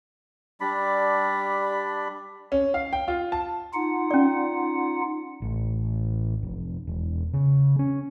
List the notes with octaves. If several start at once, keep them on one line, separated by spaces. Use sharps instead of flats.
G3 D4 D5 B5
C#4
F5
G5
F4
A5
D#4 F4 F#5
C#4 D5
A1
F1
E1
C#3
C#4